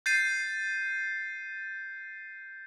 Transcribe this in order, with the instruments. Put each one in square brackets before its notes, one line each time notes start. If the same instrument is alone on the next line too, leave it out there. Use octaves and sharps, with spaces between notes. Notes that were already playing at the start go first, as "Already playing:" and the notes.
[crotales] G6 A6 C7 D#7